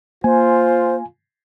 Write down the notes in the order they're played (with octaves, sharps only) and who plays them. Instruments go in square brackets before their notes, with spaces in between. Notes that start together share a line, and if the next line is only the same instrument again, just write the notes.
[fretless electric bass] A#3 [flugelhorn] F4 [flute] C5 [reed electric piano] G#5